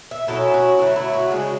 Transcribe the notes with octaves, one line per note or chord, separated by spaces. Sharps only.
E5
B2 F#3 C#4 E4 A4
F#4
D3 F#3 A3 E4
E4
F#4
C#3 G#3 D4 F#4